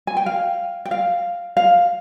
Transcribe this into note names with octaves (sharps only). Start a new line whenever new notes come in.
G#5
G5
F5
G5
F5
F5